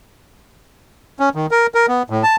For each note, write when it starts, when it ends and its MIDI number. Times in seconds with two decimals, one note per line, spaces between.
1.20 1.29 61
1.35 1.46 51
1.51 1.67 70
1.74 1.86 70
1.88 2.03 59
2.10 2.23 45
2.23 2.36 81